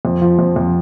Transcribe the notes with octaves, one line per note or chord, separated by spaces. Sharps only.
F2
F3
F2
F2